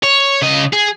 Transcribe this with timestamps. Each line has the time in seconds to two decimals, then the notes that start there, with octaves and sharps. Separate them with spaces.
0.03 C#5
0.42 C#3 D#5
0.73 G#4